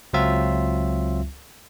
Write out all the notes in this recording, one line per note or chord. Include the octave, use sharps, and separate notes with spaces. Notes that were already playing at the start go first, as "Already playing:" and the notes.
C#2 F#3 C4 F4 E5